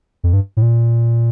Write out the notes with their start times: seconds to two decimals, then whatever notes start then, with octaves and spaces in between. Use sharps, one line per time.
0.24 F2
0.33 G2
0.57 A2
0.62 A#2